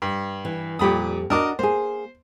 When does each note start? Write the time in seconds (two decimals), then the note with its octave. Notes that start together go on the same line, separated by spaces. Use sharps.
0.02 G2
0.45 E3
0.79 F2 A#2 G3 G4 B5 D#6
1.30 D4 F#4 A#4 D#5 D6
1.59 A#3 G#4 C5